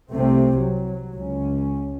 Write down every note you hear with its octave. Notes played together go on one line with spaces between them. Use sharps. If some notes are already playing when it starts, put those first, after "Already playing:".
C2 C3 A3 C4
F#3
C#2 C#4